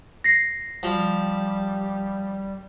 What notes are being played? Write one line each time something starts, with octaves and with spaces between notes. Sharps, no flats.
A#6 C7
F3 G3